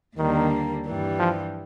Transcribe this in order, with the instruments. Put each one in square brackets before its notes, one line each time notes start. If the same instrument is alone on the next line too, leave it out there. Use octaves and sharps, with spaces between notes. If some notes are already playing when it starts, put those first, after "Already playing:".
[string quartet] D#2 D3 G3 A#3 D4 [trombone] D#3
[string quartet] G2 E3 G3
[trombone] F3